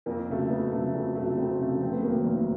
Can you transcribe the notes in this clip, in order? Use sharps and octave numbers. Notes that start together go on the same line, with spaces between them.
F2 A#3
C#3 F#3 A3
F2 B3
C#3 F#3 A3
F2
C#3 F#3 A3
F2 C4
C#3 F#3 A3
F1 C4
B3
D#2 D#3 F#3 A#3
F1